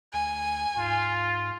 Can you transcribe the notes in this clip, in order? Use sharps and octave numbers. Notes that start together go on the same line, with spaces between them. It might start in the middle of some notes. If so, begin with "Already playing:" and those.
D2 G#5
G#2 F4